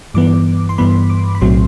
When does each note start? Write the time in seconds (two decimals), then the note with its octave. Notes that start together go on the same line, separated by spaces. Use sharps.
0.14 G2 E3 B3 D6
0.69 C6
0.78 G2 E3 B3 B5
1.10 D6
1.35 B5
1.41 B1 A2 F#3 C4 C6